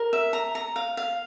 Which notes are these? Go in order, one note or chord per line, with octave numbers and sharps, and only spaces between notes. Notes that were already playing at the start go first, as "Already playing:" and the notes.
Already playing: A#4
E5
A#5
A#5
F5
F5